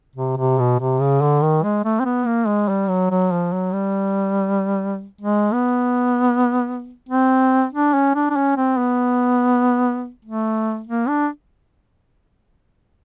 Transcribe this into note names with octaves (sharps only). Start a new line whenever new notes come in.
C3
C3
B2
C3
C#3
D3
D#3
G#3
A3
C4
B3
A#3
G#3
G3
F#3
F#3
F3
F#3
G3
G#3
B3
C4
D4
C#4
D4
D4
C#4
C4
B3
A3
A#3
D4